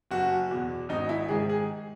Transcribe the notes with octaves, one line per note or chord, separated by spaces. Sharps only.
F#1 F#4
E2 B2
G#1 D#4
E4
G#2 D#3 G#3 G#4
G#4